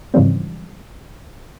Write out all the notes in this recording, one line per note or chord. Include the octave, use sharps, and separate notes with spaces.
G#2 C#3 E3 F3 G3 C4